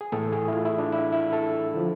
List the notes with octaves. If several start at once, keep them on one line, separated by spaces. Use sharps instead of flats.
G#4
A2 E3 A3 A4
G#4
E4
F4
E4
D4
E4
E4
A4
D3 F3